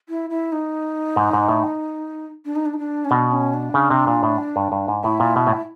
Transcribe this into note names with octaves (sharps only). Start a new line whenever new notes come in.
E4
E4
D#4
G#2
G#2
A2
D4
D#4
D4
D#4
D4
C#4
B2 D4
C#4
D4
C#3
C3
A#2
A2
G2
G2
G#2
A2 E4
A#2
B2
A2